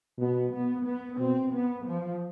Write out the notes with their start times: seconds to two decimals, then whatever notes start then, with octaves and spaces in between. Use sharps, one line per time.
0.18 B2 B3
0.52 B3
0.85 B3
1.18 B2 C4
1.51 B3
1.84 F3